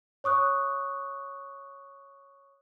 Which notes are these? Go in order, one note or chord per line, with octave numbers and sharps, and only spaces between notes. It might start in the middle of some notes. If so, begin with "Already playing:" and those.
C#5 C#6 D#6 F#6